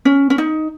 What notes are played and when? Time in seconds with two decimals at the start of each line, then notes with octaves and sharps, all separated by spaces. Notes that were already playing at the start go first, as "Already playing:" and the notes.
0.05 C#4
0.30 C#4
0.38 D#4